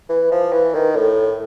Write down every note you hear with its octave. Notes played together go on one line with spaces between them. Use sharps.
E3
F3
E3
D#3
A2